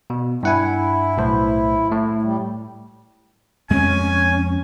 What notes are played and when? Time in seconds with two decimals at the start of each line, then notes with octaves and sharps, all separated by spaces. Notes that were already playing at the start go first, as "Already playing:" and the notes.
0.10 B2
0.43 G2 E4 F#5 G#5
1.17 B1 A2 C5
1.92 A2
2.22 G3
3.70 F2 G#3 C4 C#4 G#5